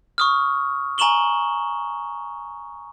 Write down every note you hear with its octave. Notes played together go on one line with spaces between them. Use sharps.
C#6 D#6 F6
G#5 A#5 C#6 E7 F#7 G7